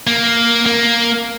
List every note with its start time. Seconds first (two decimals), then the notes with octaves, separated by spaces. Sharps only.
0.07 A#3
0.66 A#3